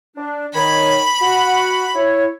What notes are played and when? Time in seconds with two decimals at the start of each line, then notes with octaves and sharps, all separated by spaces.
0.16 D4
0.54 D#3 C#5 B5
1.22 F#4
1.94 E4 C#5